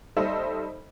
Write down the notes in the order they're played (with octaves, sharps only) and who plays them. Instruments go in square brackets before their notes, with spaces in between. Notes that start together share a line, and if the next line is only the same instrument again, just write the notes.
[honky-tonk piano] G3 D#4 A4 C5 D#5 E5